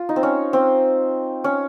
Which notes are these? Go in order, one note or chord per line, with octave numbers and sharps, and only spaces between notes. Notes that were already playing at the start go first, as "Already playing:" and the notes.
Already playing: F4
D#4
C4
C#4
C4
C#4